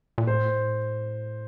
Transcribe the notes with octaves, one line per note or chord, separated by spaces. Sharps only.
A#2
A2 C5